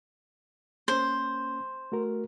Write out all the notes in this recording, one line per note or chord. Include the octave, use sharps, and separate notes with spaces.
A#3 C#4 C5
A3 F#4 A#4